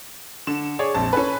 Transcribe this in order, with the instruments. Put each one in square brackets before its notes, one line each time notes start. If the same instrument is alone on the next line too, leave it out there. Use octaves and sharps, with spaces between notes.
[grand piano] D3 [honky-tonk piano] E7
[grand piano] G#4 C#5 D5
[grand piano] A#1 F2 [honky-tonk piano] A5
[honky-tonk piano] C#4 A4 B4 [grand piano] G#5